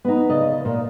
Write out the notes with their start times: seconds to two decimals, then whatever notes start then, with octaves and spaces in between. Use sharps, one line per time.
0.05 B3 D#4
0.30 C#3 D5 D#5
0.61 D#2 A#2